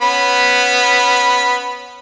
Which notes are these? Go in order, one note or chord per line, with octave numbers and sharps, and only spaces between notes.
B3 C#4 B5